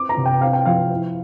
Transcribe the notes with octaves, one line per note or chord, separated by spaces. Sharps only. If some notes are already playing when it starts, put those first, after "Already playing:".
Already playing: C4 D6
A#5
C3
G5
C4 F5
G5
F3 F5
E4